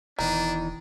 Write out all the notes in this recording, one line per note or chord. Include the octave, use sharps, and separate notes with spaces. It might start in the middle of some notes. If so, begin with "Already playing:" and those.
E1 E2 D#3 E3 D4 D#4